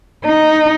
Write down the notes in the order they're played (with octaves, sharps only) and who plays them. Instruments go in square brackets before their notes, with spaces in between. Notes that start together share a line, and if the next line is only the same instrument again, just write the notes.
[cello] D#4